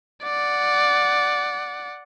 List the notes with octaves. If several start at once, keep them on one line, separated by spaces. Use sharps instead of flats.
D5 F#5